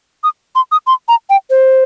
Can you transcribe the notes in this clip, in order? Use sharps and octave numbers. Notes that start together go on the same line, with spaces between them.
D#6
C6
D#6
C6
A#5
G5
C5